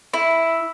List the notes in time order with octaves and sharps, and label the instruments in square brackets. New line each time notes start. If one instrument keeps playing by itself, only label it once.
[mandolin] E4